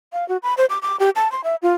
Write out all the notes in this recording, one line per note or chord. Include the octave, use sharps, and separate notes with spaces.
F5
F#4
B5
C5
D6
D6
G4
A5
C6
E5
F4